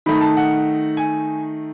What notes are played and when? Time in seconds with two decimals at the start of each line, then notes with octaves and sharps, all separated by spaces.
0.06 D#3 A3 D#4 B5
0.21 A5
0.37 F#5
0.97 G#5